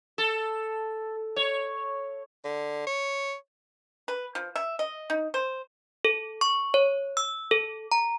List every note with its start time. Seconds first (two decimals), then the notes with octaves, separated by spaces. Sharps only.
0.18 A4
1.36 C#5
2.44 D3
2.87 C#5
4.08 B4
4.35 F3
4.55 E5
4.79 D#5
5.10 D#4
5.34 C5
6.05 A4
6.41 C#6
6.74 C#5
7.17 E6
7.51 A4
7.92 A#5